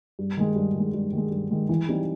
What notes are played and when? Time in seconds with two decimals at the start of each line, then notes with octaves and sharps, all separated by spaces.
0.19 G2
0.37 D#3 G#3
0.56 G2
0.75 D#3 G#3
0.94 G2
1.13 D#3 G#3
1.31 G2
1.51 D#3 G#3
1.69 E3
1.88 G3 C4 D#4